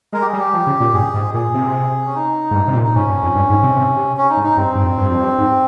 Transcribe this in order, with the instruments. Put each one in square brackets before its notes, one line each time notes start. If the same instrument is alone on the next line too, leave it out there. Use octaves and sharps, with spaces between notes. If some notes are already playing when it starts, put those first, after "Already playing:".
[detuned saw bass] G#3 [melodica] A#4
[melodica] G4
G#4
[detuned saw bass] G3
[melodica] G4
[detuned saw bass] F3
C#3
A#2
[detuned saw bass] G2 [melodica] G#4
[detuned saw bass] G#2
[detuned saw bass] A#2 [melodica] G#4
[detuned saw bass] C3
[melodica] C#4
D#4
[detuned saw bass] G#2
G2
C3
A#2
[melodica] D#4
[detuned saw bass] G#2 [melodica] C#4
[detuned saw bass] G2
F2
G2
G#2
C3
C3
C3
[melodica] C#4
D#4
[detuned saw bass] G#2
[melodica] D#4
[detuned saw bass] G2 [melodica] C4
[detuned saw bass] G2
F2
G2
F2
G2
G#2